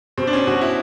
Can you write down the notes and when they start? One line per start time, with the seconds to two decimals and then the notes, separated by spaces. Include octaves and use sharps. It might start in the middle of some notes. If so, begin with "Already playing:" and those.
0.18 B2 C4
0.27 D4
0.33 C#4
0.47 B2 F#4
0.61 E4